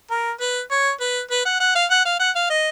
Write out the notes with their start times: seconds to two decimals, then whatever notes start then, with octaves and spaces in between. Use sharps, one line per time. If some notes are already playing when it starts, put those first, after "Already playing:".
0.11 A#4
0.41 B4
0.71 C#5
1.01 B4
1.31 B4
1.46 F#5
1.60 F#5
1.76 F5
1.90 F#5
2.05 F5
2.20 F#5
2.36 F5
2.50 D#5